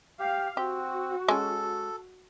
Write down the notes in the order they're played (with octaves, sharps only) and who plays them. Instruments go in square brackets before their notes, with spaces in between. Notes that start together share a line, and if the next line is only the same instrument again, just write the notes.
[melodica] G4 [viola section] F5
[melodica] C4 [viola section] F#4 [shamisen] G4
[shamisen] G#3 C#4 [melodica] A4